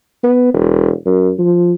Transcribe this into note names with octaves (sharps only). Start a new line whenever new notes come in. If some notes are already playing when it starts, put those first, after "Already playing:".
B3
E1
F#2
F3